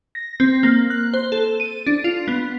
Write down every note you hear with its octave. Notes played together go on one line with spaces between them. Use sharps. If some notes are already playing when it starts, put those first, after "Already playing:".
A#6
C4
A#3
F#6
C5
A4
D#7
D4
F4
B3